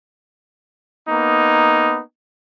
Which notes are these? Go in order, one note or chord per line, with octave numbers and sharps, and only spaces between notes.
A#3 B3 D#4